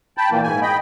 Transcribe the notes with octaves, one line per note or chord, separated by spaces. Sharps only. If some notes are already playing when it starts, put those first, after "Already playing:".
G5 A5 B5
A#2 E3 A#3
G#2 G#5
D#5 G5 B5